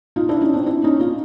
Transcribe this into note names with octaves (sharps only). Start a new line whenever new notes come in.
D#4 F4
D4 E4
C#4 D#4
C4 D4
D4 E4
C#4 D#4
D#4 F4